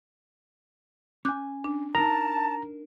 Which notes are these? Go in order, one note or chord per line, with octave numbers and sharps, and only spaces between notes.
C#4 G#5 D6 F#6 G6
D4
D4 D#4 A#4 A5 A#5